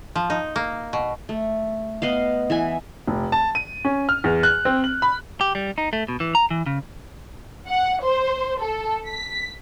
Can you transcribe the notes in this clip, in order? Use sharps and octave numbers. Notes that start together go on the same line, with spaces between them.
F3
D#4
A#3
B2
A3
B3 D#5 F5
E3 E5 G#5
F1
A5
D#7
C#4
F6
E2
F#6
C4
F#7
B5
G4
G3
D#4
A3
B2
E3
A#5
E3
C#3
F#5
C5
A4
B6